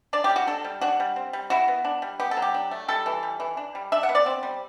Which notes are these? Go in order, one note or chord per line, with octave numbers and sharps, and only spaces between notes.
D4 D5
G4
G3
F#4
D4 A4
G3
D4 F#4
G3
C4
G3
E4 F#4
B3
D4
G3
B3 G4
A4
F#3
G4
D4
A3
G3 A4
E3
G3
E3
D4
G3
D4 E5
F#5
B3
D5
C4
G3